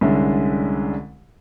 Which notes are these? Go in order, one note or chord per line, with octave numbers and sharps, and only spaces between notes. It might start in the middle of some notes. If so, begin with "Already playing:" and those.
C2 D3 G#3 C#4 E5